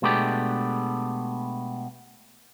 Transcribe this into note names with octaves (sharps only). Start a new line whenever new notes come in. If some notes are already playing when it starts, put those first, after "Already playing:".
B2 G#3 A3 B3 D4 G4